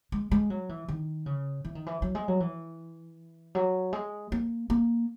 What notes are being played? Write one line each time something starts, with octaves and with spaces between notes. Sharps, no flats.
G#3
G#3
F#3
E3
D#3
C#3
E3
D#3
E3
F#3
G#3
F#3
E3
F#3
G#3
A#3
A#3